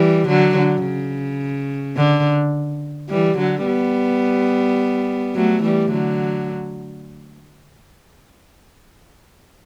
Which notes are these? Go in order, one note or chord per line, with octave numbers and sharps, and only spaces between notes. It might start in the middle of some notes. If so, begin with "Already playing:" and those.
Already playing: E3 G3
D3 F#3
D3
C#3
D3
E3 G3
D3 F#3
G3 B3
F#3 A3
E3 G3
D3 F#3